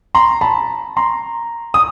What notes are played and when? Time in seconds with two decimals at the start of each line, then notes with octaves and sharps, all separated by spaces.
0.15 A#5 C6
0.41 A5 B5
0.97 A#5 C6
1.74 D#6